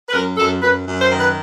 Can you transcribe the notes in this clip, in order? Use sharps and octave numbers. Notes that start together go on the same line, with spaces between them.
B4
F#2 A#4
F#2 A4
F#2 B4
F#2
C5
D#3
B4